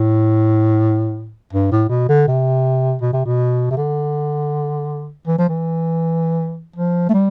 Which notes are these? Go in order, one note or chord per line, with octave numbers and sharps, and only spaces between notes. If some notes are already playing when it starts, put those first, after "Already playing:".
Already playing: A2
G2
A2
B2
D3
C3
B2
C3
B2
C3
D3
E3
F3
E3
F3
A3
G3